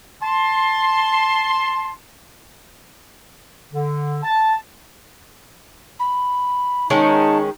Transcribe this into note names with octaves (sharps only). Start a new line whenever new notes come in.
A5 C6
D3
A5
B5
D#3 G#3 C#4 D#4 A5